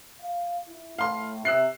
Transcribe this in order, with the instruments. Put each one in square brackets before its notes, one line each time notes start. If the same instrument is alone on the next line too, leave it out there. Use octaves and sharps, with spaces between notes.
[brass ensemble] F5
E4
[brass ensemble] A2 [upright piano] F5 C6
[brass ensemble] C3 E5 [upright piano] E6 F#6 C7